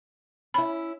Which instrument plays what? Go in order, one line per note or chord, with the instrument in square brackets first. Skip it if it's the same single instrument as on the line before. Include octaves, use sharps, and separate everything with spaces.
[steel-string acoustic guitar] C#4 E4 [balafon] B5